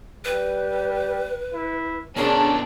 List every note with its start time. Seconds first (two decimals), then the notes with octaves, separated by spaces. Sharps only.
0.25 G3 B4
1.55 E4
2.17 B2 C#4 D4 G#4 A#4